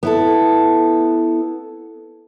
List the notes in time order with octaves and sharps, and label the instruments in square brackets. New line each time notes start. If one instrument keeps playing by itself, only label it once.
[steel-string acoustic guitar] B3 E4 A4